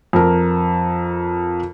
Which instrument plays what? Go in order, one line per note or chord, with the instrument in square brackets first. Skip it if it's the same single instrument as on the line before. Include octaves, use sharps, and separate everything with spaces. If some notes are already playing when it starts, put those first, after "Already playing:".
[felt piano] F2 A#4